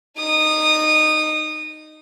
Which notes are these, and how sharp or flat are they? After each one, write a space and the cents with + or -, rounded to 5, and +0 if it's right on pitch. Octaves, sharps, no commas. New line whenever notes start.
D#4 -10 D#6 -20